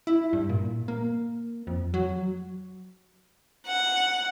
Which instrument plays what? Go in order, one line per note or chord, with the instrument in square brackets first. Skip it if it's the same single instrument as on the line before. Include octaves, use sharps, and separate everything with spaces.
[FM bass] E4
G2
A#2
A#3
F2
F#3
[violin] F#5